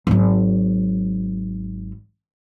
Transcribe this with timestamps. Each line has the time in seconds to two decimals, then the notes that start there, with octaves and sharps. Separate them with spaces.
0.07 G#1 F#3